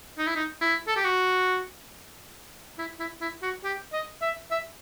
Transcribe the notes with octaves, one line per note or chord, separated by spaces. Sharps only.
D#4
E4
D#4
E4
A4
G4
F#4
E4
E4
E4
F#4
G4
D#5
E5
E5